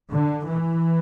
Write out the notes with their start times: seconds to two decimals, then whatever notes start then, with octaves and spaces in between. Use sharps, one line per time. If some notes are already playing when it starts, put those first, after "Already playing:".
0.12 D3
0.49 E3